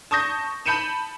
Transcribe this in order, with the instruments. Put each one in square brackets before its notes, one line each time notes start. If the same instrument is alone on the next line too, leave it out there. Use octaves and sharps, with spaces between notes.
[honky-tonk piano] A5 C#6 D#6 G6 A#6
A5 B5 G6 C#7 D#7 E7